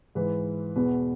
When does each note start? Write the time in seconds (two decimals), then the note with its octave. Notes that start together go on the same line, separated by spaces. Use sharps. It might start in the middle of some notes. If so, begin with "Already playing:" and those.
0.15 G#2 E3 B4
0.76 E2 B2 B4